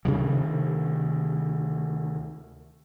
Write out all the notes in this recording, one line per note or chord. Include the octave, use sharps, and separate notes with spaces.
D2 C3 D#3 E3